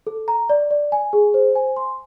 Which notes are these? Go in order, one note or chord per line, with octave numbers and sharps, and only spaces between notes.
A4
A#5
D5
D5
G#5
G#4
C5
G#5
C6